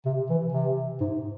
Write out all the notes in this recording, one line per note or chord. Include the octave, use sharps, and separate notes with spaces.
C3
E3
C3
G#2